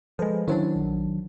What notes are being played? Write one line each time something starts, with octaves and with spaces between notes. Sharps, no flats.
F3 G#3 A4 B4
D#3 F#3 C#4 D4 E4 C5
A#1